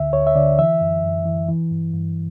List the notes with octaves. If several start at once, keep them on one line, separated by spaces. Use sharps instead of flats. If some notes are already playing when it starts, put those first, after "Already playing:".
Already playing: D2 D3 E5
D2 C#5
E5
D3 D5
E3 E5
F#2
F#2
E3
E3
G2
G2